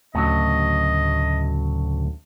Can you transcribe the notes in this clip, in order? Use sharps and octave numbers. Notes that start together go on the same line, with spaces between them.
D2 A2 C#3 F#3 D#5